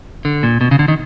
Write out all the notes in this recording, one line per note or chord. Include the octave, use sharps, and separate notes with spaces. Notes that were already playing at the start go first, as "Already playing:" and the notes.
D3
A#2
B2
C#3
D3
D#3